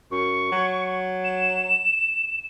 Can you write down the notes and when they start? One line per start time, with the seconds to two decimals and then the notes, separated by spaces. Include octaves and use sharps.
0.11 F#2 C#6
0.52 F#3
1.24 E7